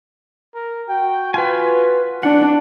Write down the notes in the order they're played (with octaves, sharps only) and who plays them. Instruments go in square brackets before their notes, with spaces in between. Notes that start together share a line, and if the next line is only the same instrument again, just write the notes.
[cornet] A#4
[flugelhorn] F#4 [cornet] G5
[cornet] F4 [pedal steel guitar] B4 G#5
[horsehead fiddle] D4 [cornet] D5 [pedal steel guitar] F#5